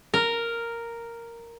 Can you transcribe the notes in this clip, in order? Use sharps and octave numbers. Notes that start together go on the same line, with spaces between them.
A#4